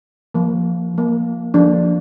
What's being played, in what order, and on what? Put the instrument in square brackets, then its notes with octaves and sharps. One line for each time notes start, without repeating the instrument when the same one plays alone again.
[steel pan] F3 A#3
F3 A#3
F3 A#3 D4